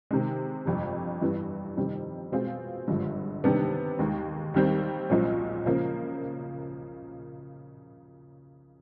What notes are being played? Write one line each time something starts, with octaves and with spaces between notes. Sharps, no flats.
C3 D#3 G#3
G1 F2 C3
G2 E3 G3 B3
F2 C3 D#3 G3
B2 G#3 C4 F4 G#4
G#1 G2 D3 F3 G#3
C3 D#3 G3 B3 D4
D#2 D#3 G#3
D#2 D#3 G3 C4
B1 A#2 F3 G#3 C#4
C#3 F3 A#3